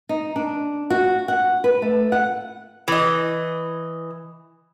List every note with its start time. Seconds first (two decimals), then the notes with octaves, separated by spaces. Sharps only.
0.09 D#4
0.36 D4
0.90 F#4
1.28 F#5
1.64 B4
1.82 A3
2.12 F#5
2.88 E3 D#5